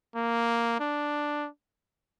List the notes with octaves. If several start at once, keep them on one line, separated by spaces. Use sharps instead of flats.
A#3
D4